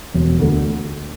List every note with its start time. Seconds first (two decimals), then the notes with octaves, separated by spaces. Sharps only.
0.14 E1
0.39 D2 D3 A3